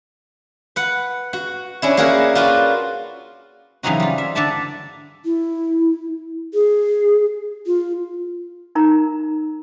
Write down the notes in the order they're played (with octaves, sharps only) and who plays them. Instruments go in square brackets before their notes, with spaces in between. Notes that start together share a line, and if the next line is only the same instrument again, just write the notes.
[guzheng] B4 F#5
F#4
C#4 D4 E4
A#3 E4 F#4 G#4 A#4
F4 F#4 B4 D5
C#3 E3 F#3 C4 D#4 F#4
G3 F4
E5
D3 A4 D5 E5 A5
[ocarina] E4
G#4
F4
[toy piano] D#4 A#4 A#5